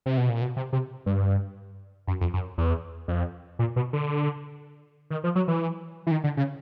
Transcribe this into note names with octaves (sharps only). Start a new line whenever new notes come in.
C3
B2
A#2
B2
C3
C3
G2
F#2
F2
F#2
E2
F2
A#2
B2
D3
D#3
F3
F#3
E3
E3
D#3
D3
C#3